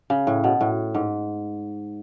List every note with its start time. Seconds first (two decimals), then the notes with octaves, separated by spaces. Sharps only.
0.10 C#3
0.27 A2
0.44 B2
0.61 A2
0.95 G#2